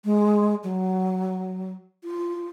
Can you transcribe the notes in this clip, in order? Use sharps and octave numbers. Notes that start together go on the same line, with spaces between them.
G#3
F#3
F4